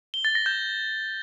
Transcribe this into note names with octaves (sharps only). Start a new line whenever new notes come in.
G7
A6
A#6
G6